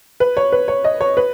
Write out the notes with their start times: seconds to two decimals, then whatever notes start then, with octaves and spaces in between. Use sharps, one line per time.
0.20 B4
0.37 C#5
0.52 B4
0.68 C#5
0.84 D#5
1.01 C#5
1.17 B4